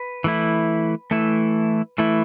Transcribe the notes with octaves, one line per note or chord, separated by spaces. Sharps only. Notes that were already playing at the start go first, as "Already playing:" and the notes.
Already playing: B4
E3 A3 E4
E3 A3 E4
E3 A3 E4